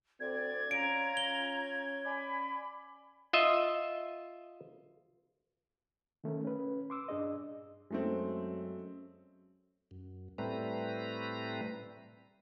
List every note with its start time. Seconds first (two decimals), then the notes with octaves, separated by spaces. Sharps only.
0.20 D2 C4 D5 G#6
0.71 C#4 F4 A#5 D7
1.17 G7
2.05 D5 G#5 B5
3.33 F4 D#5 E5
6.24 D#3 A3 C#4 A#4
6.45 C#4 B4
6.90 C6 D6 E6
7.09 G2 D4 G#4 D#5
7.91 F#2 G#3 A3 C4
9.91 F#2
10.38 A2 G3 A3 C4 B4 A#5